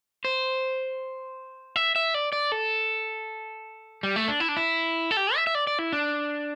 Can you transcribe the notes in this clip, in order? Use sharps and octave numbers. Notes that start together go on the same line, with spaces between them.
C5
E5
E5
D5
D5
A4
G3
A3
D4
E4
D4
E4
A4
G4
E5
E5
D5
D5
E4
D4